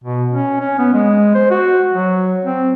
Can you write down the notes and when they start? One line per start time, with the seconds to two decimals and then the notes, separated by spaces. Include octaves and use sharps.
0.04 B2
0.32 C#4
0.60 C#4
0.79 B3
0.94 G#3
1.35 C5
1.51 F#4
1.93 F#3
2.45 C4